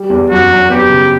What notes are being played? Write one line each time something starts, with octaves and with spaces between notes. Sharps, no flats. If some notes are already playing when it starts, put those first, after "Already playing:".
Already playing: G3
E2
F#2 F#4
F#2
B3 G4
C#3